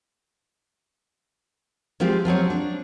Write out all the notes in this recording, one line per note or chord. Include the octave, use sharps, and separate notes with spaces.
F3 G#3 C4 F4 G4
F3 F#3 C4 C#5
D4